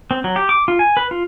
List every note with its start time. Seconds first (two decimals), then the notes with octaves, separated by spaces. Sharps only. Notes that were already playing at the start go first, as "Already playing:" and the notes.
0.11 C4
0.24 F#3
0.36 G4
0.49 D6
0.68 F4
0.79 G#5
0.97 B4
1.11 F4